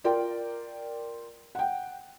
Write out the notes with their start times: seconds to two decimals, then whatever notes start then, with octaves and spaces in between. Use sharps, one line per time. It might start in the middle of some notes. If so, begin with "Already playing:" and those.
0.04 F4 A#4 D5 G5
1.55 F#5 G5